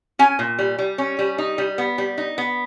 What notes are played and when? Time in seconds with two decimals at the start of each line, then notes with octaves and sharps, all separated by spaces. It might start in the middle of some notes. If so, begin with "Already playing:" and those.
0.19 C#4 G#5
0.39 A#2
0.59 G3
0.79 G3
0.98 C#4
1.19 G3
1.38 D#4
1.58 G3
1.78 B3
1.98 G3
2.18 D#4
2.38 B3